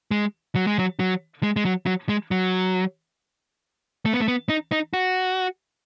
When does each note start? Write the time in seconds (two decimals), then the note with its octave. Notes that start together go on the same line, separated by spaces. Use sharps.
0.11 G#3
0.55 F#3
0.67 G#3
0.79 F#3
1.00 F#3
1.43 G#3
1.56 G#3
1.65 F#3
1.86 F#3
2.09 G#3
2.31 F#3
4.05 A3
4.13 B3
4.20 A3
4.28 B3
4.49 D#4
4.72 D#4
4.93 F#4